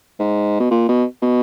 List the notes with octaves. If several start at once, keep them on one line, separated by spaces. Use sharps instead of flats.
G#2
B2
A#2
B2
B2